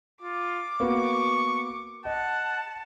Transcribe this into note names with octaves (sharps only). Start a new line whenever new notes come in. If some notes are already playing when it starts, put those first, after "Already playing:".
F4 D6
A#3 B3 F#4 C#6
D#5 F#5 A5